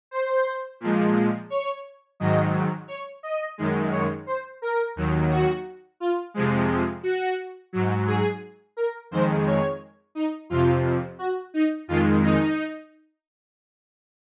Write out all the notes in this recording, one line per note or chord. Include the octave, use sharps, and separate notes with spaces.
C5
A#2 F3 G#3
C#5
G#2 D#3 F#3 D#5
C#5
D#5
F#2 D#3 G#3
C#5
C5
A#4
D#2 D#3 F#3
F#4
F4
F2 C3 F3 G#3
F#4
G#2 F#3
G#4
A#4
F2 D#3 G#3 C5
C#5
D#4
F2 C3 F3 F4
F#4
D#4
F2 D#3 G#3 F4
D#4